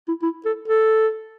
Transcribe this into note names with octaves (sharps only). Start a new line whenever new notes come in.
E4
E4
A4
A4